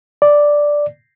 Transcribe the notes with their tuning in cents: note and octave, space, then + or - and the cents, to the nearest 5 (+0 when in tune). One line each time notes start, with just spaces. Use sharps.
D5 +0